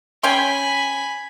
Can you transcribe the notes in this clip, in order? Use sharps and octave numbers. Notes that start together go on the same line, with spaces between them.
C#4 G5 G#5 B5 C6